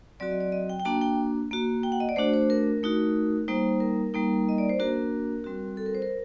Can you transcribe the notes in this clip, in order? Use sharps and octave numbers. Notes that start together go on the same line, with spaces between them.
F#3 C4 F#4 D5
D#5
D5
D#5
G5
G5
A#3 D4 F#4 A5
G5
A#3 F#4
G5
F#5
D#5
D5
A3 D4 F#4 C5
C5
A#4
A3 D#4 F#4
G3 A#3 D#4 C5
A#4
G3 A#3 D#4
D#5
D5
C5
A#3 D4 F#4 A#4
G3 C4 F#4
A4
A#4
C5
A#4